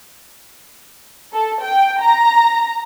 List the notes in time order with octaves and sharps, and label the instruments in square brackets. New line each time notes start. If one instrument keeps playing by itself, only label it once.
[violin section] A4
G5
A#5 A#6